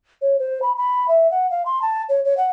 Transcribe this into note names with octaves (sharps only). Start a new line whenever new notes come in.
C#5
C5
B5
B5
E5
F#5
F5
C6
A5
C#5
C#5
F#5